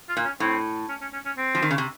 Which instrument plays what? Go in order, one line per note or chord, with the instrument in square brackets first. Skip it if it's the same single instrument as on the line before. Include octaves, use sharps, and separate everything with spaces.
[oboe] F4
[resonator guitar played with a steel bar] A#2
[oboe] C#4
[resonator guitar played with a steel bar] A2 [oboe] C4
[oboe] C#4
C#4
C#4
C#4
C4
[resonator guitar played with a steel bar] F3
D#3
C#3
C3